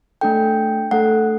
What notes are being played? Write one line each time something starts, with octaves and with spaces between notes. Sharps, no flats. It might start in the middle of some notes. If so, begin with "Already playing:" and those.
A3 D4 A4 G5
A3 D4 A4 F#5